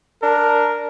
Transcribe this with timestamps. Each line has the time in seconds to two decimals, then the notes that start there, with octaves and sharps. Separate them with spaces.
0.22 D4 A#4